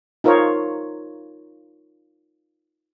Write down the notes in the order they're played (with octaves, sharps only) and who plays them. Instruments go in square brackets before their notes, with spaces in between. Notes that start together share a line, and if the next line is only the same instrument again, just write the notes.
[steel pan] D#4 F4 A#4 C5 C#5